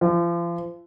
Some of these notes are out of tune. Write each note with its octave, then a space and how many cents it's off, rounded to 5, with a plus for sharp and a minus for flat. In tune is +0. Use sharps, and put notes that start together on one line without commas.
F3 -35